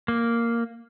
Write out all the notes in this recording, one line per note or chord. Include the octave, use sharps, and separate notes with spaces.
A#3